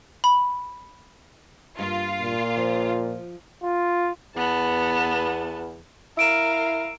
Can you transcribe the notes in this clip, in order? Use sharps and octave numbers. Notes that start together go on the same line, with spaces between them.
B5
G2 A#3 F4
A#2
F3
F4
E2 B3 A5
E4 A#4 F5 E6 D7 E7